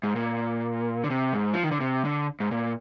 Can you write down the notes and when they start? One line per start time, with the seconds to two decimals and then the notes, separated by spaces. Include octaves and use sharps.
0.03 G#2
0.16 A#2
1.04 D3
1.10 C3
1.33 G#2
1.54 F3
1.63 D#3
1.72 D3
1.80 C3
2.05 D3
2.40 G#2
2.51 A#2